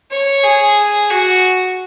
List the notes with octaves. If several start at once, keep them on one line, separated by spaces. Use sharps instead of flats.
C#5
G#4
F#4